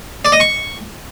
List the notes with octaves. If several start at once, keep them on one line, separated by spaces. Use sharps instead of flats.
D5
D#5
C#6